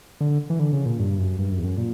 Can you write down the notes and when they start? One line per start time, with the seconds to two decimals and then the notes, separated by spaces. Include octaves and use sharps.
0.21 D3
0.50 E3
0.59 D3
0.73 C#3
0.86 A#2
0.99 G2
1.18 F#2
1.39 G2
1.51 F#2
1.58 E2
1.64 F#2
1.78 A#2